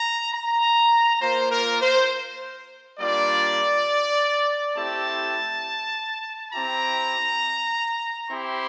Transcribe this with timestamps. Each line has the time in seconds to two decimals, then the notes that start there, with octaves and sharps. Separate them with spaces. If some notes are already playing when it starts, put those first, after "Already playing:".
Already playing: A#5
0.33 A#5
1.21 A#3 F4 C5
1.51 A#4
1.81 C5
2.99 G3 A#3 D4 F4 D5
4.76 A3 C4 E4 G4 A5
6.53 C4 E4 G4 A#5
8.30 C4 E4 G4 C6